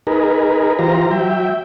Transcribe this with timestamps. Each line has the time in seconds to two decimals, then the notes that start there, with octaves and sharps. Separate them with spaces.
0.07 D#4 G#4 A#4 B4
0.79 E3 F4 G4 C5 A#5
1.11 F#3 E5 G5